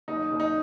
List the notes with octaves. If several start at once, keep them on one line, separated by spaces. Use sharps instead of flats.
F#1 D#4
F#1
D#4